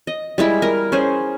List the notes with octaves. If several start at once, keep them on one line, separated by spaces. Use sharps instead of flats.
D#5
G3 G#3 E4
A#4
C#4 G#4 C5